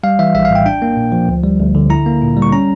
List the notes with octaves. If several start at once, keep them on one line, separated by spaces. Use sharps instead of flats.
G3 F5
E3 E5
A#1 E5
F5
A2
G5
D4 G5
A#3
A#2
F3
D2
G3
D2
D3
E4 A#5
A#3
A#2
G3
C#6
C#4 A#5